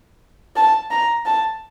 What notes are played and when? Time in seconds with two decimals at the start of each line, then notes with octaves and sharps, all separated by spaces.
0.56 A5
0.91 A#5
1.26 A5